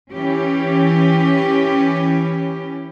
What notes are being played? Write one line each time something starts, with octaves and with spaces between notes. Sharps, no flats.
E3 C#4 G4